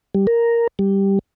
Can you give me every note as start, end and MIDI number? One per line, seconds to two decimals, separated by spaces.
0.15 0.27 55
0.27 0.67 70
0.79 1.19 55